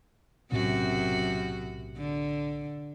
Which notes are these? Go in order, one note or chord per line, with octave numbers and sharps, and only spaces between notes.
B1 F#2 A2 C3 C4 F#4
D3